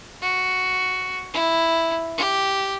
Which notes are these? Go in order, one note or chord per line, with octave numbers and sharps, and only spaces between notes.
F#4
E4
G4